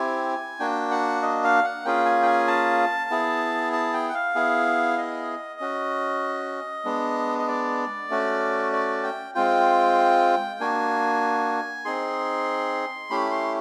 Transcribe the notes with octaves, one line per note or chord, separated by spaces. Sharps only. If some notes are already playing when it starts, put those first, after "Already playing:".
Already playing: C4 E4 G4 G#5
A#3 D4 F#4 G5
F#5
D#5
F5
F#5
A#3 C#4 F4 G#4 G5
G#5
G5
G#5
A5
B3 E4 G#4
A5
G5
F#5
F5
B3 E4 G#4
D#5
C#4 F#4
G#3 B3 D4
D#5
D5
A3 C#4 F#4
D5
G5
G#3 C4 F4 G5
A#3 D4 F#4 G#5
C4 D#4 G#4 C6
A3 C#4 E4 G4 B5
C6